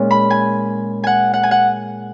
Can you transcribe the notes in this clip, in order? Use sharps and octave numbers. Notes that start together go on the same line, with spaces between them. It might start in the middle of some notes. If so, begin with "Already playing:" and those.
Already playing: A#2 G#3 C#4
B5
G#5
F#5 G#5
F#5
G#5
F#5